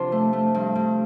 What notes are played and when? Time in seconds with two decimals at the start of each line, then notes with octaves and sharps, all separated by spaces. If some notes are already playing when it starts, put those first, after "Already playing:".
Already playing: C3 F3 C4 D4 F4
0.12 A3
0.33 A3
0.54 G2
0.75 G2